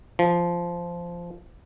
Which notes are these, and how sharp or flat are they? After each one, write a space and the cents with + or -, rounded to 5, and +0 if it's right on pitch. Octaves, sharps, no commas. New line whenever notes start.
F3 -10